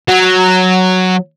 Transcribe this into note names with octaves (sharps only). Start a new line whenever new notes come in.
F#3